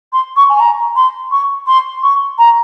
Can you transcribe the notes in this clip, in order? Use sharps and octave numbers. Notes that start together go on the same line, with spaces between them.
C6
C#6
G#5
A#5
C6
C#6
C6
C#6
A#5